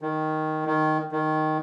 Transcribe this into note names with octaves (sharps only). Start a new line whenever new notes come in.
D#3
D#3
D#3